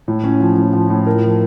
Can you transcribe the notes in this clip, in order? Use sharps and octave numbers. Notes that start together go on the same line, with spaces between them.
A2
C#4
F3
A2
F3
A2
A#4
F3